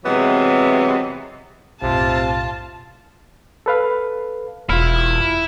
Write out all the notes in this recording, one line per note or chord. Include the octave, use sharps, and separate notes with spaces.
C3 E3 F#3 G#3 B3
B1 F#2 A2 C3 F4 A5
A4 B4 F5
E1 E4 F4 F6